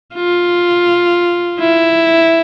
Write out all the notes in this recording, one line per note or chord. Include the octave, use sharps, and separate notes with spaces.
F4
E4